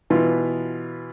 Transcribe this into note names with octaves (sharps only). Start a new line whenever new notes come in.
B2 E3 B3 F4